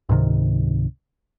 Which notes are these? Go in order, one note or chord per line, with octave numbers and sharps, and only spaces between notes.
C#2 G#2 C3 D#3